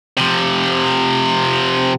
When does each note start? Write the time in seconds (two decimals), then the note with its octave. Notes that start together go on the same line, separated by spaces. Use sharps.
0.18 C3 F3